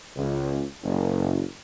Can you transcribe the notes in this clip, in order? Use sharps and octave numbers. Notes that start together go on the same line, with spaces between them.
C#2
F#1